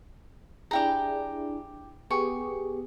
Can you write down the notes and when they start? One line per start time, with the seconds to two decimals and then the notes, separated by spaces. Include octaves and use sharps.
0.71 D4 E4 G4 G#4 G5 A#5
2.10 B3 G4 G#4 C#6